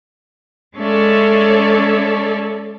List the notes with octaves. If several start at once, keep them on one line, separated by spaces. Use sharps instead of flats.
G#3 C#4 A4 C#5 D5 E5